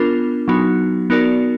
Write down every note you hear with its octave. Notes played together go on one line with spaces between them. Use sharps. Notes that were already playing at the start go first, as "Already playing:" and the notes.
Already playing: B3 D4 F4 A#4
F#3 B3 D#4 F#4
B3 D#4 F#4 A#4 D5